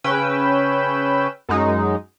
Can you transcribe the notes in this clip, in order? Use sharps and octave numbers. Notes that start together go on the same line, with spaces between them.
C#3 C#4 B4 G5 E6
F#2 F#3 G#3 D#4